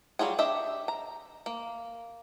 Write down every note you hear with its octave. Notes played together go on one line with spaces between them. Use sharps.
F#3 G3 F4 G#4
D4 G4 D#5 E5
A#5
A#3